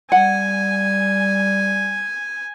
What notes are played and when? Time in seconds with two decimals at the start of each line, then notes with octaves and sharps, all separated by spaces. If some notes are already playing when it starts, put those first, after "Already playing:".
0.12 G3 F#5 G#5